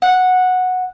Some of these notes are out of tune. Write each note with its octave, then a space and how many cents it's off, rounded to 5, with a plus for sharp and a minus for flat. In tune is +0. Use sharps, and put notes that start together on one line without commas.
F#5 -10